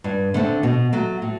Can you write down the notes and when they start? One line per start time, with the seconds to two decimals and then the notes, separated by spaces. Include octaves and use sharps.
0.04 G2
0.34 D3 A3 C4
0.63 B2
0.93 F#3 A3
1.22 A2